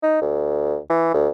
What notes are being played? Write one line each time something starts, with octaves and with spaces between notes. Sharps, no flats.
D#4
D2
E3
D2